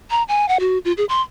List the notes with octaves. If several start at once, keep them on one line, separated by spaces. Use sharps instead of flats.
A#5
G#5
F#5
F#4
F4
G#4
C6